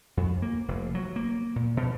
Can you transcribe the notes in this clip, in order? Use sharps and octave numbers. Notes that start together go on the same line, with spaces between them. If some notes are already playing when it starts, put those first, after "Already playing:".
F2
A#3
F1
F#3
A#3
A#2
B2